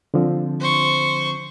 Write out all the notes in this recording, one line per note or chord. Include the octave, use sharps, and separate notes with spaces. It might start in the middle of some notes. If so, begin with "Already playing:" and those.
D3 F3 C4
C5 C#6